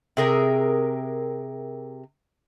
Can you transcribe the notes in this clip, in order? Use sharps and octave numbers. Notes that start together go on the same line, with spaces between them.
C3 G#4 A#4 G5